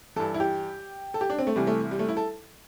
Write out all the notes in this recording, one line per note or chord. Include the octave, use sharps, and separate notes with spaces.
G2 E3 A4
E4
G4
A4
G4
D4
C4
A3
C2 C3 E3 G3
A3
G3
A3
E4
A4